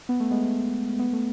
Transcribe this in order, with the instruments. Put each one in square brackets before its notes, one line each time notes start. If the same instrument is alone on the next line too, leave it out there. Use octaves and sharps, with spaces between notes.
[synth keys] B3
A3
G#3 B3
B3
A3